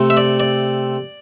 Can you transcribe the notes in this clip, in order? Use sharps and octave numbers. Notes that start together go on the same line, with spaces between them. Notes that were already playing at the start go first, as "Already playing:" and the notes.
Already playing: C3 A3 C4
E5
D5
D5